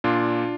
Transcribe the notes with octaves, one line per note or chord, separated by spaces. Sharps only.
A#2 D4 F4